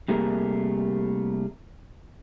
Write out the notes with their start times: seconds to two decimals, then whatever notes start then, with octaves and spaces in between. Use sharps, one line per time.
0.08 C3 G3 A3 A#3 G#4 A#4